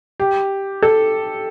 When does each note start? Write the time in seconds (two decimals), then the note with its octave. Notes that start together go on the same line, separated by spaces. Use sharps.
0.20 G4
0.82 A4